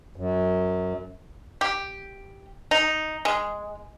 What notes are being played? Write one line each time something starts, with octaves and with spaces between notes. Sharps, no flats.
F#2
G4
D#4
G#3